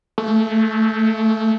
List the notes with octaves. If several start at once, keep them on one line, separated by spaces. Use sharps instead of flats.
A3